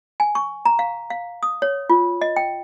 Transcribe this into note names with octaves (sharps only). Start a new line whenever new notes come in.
G#5
C#6
A#5
F5
F5
D#6
C#5
F4
D#5
G5